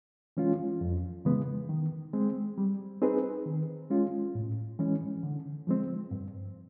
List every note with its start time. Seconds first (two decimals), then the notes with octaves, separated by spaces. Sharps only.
0.37 E3 G#3 C#4 F4
0.81 F2
1.25 C#3 E3 G#3 B3
1.69 D#3
2.13 G#3 C4
2.58 G3
3.02 C4 D#4 G#4 B4
3.46 D#3
3.90 G#3 C#4 F4
4.35 A2
4.79 E3 G#3 C#4
5.23 D3
5.67 F3 G#3 C4
6.11 G2